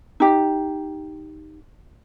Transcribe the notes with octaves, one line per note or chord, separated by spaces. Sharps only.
D#4 G4